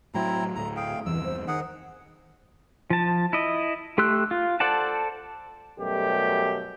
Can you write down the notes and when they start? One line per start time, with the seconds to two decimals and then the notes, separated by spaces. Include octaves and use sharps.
0.14 A2 F#3 C4 E4 A#5
0.56 D1 A2 A3 A#5
0.77 G#4 F5 G5
1.06 E2 G2 C3 E3 E6
1.24 C5
1.48 D#3 G#4 F#5
2.90 F3 A5
3.33 E4 D#5
3.98 A3 G4 C6 E6 F#6
4.31 F4
4.60 A4 C5 D5 F#5 A5
5.79 F#2 B2 G3 A3 G4